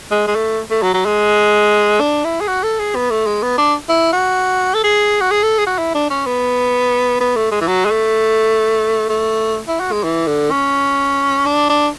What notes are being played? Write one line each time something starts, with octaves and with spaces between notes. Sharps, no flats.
G#3
G#3
A3
A3
F#3
F#3
G#3
D4
E4
G#4
F#4
A4
G#4
B3
A3
G#3
B3
D4
E4
F#4
A4
G#4
F#4
G#4
A4
G#4
F#4
E4
D4
C#4
B3
B3
A3
G#3
E3
F#3
G#3
A3
A3
E4
F#4
G#3
E3
D3
C#4
D4
D4